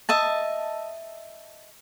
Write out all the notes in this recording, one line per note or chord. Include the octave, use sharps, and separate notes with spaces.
D#5 E5 A5